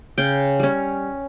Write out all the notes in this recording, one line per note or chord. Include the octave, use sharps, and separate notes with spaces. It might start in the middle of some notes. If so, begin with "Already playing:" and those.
C#3 G5
G3 C#4